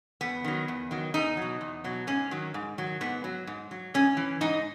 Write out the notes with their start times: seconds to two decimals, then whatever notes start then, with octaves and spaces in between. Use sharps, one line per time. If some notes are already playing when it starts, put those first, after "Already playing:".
0.21 E2 B3
0.44 D#3 F#3
0.68 E2
0.91 D#3 F#3
1.14 E2 D#4
1.37 B2 F#3
1.61 E2
1.84 B2 F#3
2.07 G#2 C#4
2.31 D#3 F#3
2.54 G#2
2.78 D#3 F#3
3.01 G#2 B3
3.24 F#3
3.47 G#2
3.71 F#3
3.94 G#2 C#4
4.17 E3
4.41 G#2 D#4